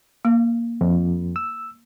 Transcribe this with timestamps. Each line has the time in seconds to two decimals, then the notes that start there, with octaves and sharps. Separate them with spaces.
0.25 A#3
0.81 F2
1.36 E6